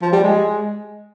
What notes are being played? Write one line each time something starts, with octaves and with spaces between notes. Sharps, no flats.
F3
G3
G#3